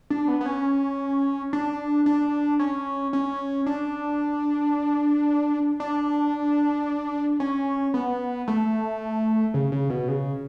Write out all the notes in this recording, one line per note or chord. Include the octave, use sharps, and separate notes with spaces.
D4
B3
B3
C#4
D4
D4
C#4
C#4
D4
D4
C#4
B3
A3
C#3
C#3
B2
C#3